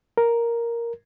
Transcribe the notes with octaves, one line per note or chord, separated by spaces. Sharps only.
A#4